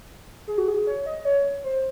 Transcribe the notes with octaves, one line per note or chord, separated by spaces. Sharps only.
G#4
F#4
G#4
C#5
D#5
C#5
C5